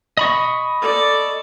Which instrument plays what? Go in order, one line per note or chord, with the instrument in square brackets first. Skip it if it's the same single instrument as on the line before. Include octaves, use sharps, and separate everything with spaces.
[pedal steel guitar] D#5 B5 C#6
[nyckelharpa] A4 D5